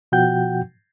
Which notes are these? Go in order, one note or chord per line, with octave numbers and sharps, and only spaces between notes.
B2 F3 F#4 F#5 G5 G6